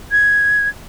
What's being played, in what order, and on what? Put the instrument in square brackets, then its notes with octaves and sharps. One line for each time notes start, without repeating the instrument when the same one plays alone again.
[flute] G#6